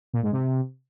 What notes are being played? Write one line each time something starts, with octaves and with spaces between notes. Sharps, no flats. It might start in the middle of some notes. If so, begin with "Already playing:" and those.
A#2
G#2
C3